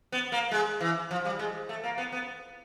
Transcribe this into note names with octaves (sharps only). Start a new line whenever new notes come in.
B3
A#3
G#3
E3
F3
G3
G#3
A3
A#3
B3
B3